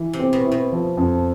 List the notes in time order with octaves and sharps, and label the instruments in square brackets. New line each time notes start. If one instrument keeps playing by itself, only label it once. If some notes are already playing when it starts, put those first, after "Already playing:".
Already playing: [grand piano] E3
[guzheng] C3
[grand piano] C4
[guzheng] B2
[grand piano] E4
[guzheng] B2
[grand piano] F3
F2